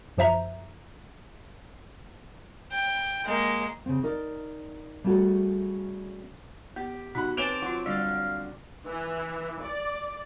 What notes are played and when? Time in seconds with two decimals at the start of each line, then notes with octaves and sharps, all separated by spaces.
0.17 F#2 F3 C5 E5 A#5
2.72 G5
3.25 G#3 A#3
3.86 C#3 C4
4.03 D#4 A#4 D5
5.04 G3 A3 C#4 F#4 G#4 A4
6.76 B3 G4
7.15 B2 D#4 F#5 B5
7.37 C4 B4 C#5 G#5 A5 D6 D7 F7
7.62 F#3 F4 F#4
7.86 D3 G3 D5 F5
8.86 E3
9.62 D5